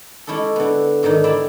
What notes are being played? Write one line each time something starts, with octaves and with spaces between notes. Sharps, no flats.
G#3 C#4 E4 G4 A4
D3 B3
G#2 D3 D#3 D#4
E4 G4 D5 E5